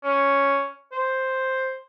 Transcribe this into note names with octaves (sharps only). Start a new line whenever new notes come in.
C#4
C5